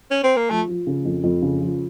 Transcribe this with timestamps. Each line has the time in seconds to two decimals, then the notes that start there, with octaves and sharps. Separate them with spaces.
0.11 C#4
0.24 C4
0.36 A#3
0.50 F3 A3
0.68 F3
0.87 C#3
1.05 F2
1.23 F2
1.42 C#3
1.61 F3